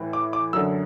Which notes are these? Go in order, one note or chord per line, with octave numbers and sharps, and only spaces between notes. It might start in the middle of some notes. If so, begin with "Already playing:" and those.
Already playing: A2 E3
D6
D6
F#2 D3 E6